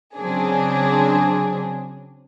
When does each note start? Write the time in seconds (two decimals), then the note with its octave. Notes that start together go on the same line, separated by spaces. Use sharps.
0.16 C#3 F#3 C4 D4 G#4